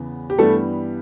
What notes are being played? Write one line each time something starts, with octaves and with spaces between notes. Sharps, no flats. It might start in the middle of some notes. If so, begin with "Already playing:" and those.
Already playing: E2 C#3 B3
G4
G2 E3 G3 A3 B3 A4